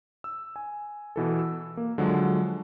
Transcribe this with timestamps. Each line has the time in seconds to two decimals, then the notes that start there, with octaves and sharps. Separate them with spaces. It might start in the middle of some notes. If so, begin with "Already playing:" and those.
0.24 E6
0.56 G#5
1.16 B2 E3 A4
1.39 E6
1.77 A#3
1.98 D3 F3 F#3 G#3